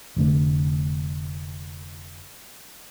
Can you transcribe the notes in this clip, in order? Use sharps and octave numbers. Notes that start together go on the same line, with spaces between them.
F1 D3 A3